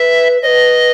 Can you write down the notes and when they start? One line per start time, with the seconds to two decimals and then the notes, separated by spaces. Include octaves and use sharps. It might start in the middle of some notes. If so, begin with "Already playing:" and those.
Already playing: B4 E5
0.42 B4 C#5 D#5